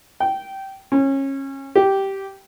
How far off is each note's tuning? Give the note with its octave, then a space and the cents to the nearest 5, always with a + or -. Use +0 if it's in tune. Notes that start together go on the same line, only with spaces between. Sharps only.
G5 -15
C#4 -25
G4 -10